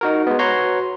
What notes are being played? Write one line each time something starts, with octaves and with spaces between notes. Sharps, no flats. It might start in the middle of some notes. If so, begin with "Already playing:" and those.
D#4 F#4 A#4
G#3 B3
F#4 B4 C#5 A#5 C6 C#6